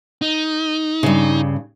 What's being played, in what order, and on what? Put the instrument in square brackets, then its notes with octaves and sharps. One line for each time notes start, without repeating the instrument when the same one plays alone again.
[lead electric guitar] D#4
[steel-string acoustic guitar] G2 C#3